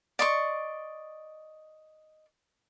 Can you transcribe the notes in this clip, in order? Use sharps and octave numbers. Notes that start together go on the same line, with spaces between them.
D5 D#5 C6 C#6